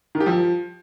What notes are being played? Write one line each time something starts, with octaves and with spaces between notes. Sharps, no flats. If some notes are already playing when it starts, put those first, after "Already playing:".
D#3
G4
F3